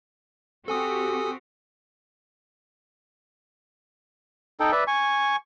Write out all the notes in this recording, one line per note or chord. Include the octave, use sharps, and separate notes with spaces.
C4 F#4 G4 A4 G#5 D#6
D#4 A4 G5
B4 D5 E5
G#5 C#6